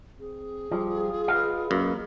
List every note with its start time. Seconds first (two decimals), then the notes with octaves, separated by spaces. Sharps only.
0.19 C4 G#4
0.71 F3 G3 F4
1.28 B4 D#5 F5
1.71 F#2 A#3